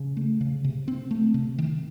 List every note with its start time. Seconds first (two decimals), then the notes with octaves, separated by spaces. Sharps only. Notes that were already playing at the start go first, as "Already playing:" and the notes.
Already playing: C#3
0.17 A3
0.41 C#3
0.64 C3
0.88 C4
1.11 A3
1.34 C3
1.58 D#3